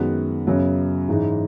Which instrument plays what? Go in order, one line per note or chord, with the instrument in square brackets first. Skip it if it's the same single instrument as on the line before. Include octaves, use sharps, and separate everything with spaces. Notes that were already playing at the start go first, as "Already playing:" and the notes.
Already playing: [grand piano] F#2 D#3 G#3 B3 F#4
F#2 C#3 F#3 B3
G#2 E3 G#3 D#4